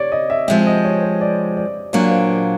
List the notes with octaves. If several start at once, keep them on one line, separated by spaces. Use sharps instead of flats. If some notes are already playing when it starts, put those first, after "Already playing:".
Already playing: C#5 D5
D#5
E5
F3 G#3 C4 E5
D#5
C#5
C5
D5
D5
A#2 F#3 A#3 D4 C#5
C5
C5